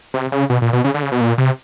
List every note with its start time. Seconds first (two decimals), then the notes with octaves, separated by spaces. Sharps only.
0.14 C3
0.32 C#3
0.50 B2
0.62 A#2
0.73 B2
0.84 C#3
0.94 D3
1.03 C#3
1.12 B2
1.21 A#2
1.38 C3